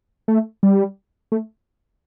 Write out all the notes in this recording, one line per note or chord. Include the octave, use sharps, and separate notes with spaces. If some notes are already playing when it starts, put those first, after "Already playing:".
A3
G3
A3